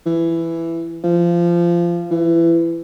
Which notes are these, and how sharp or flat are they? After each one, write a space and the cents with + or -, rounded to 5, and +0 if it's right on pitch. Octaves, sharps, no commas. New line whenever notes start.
E3 +10
F3 -20
E3 +25